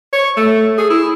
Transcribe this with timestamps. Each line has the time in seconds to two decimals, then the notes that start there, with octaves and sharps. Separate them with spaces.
0.13 C#5
0.37 A3
0.78 G#4
0.90 E4